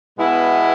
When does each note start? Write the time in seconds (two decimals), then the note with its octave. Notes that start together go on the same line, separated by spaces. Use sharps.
0.17 B2 G#3 B3 E4